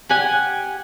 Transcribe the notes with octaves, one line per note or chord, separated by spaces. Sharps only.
G4 F#5 G#5